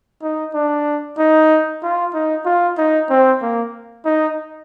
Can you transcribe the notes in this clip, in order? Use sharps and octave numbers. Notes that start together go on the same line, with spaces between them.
D#4
D4
D#4
F4
D#4
F4
D#4
C4
A#3
D#4